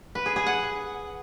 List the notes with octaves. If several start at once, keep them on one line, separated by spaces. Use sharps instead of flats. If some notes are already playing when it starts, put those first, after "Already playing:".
B4
G#4
G#4
F#5